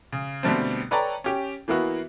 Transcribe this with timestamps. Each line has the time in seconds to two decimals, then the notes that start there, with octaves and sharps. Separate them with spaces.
0.13 C#3
0.43 B2 D3 G3 A3 C4
0.91 A4 B4 C#5 D5 G5 A#5
1.24 C#4 G4
1.68 E3 A#3 B3 E4 F#4